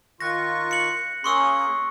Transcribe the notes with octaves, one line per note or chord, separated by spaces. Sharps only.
D#3 F4 C#6 F#6 A#6
C#7 F#7
A#3 C#4 G#4 C6 C#6 E6